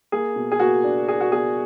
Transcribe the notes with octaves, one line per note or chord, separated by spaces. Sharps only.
A#3 G#4
B2
G#4
A#3 F#4
D4
D4 G#4
F#4
B2 G#4